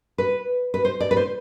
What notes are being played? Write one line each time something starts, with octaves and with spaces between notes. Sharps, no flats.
B4
B4
C5
D5
B4
C5